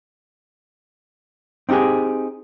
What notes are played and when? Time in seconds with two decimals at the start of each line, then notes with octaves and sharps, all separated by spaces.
1.69 C4 D#4 F4 G4 G#4